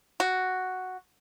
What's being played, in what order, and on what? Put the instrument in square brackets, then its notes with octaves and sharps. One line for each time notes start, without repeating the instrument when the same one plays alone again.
[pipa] F#4